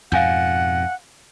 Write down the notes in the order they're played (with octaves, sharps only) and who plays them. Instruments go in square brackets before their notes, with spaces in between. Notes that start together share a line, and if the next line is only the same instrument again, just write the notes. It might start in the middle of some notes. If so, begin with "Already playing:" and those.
[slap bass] F2 G#2 B2 [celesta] F5 G#5 G6 [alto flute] F#5